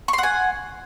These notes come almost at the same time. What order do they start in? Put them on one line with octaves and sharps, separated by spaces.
C#6 C6 F#5 G#5